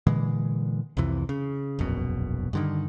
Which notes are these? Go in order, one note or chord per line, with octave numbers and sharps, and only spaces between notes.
A#2 D3 E3 G#3
C2 F2 C3 E3
C#3
E1 A#1 F#2 B2
G2 D3 D#3